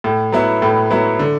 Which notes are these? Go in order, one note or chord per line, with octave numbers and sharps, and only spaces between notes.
A2
F#3 B3 E4
A2
F#3 B3 E4
D3